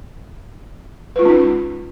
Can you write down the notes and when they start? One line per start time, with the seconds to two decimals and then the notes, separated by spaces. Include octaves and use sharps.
1.16 B4
1.19 F4
1.22 G#3
1.25 C#4
1.29 D#4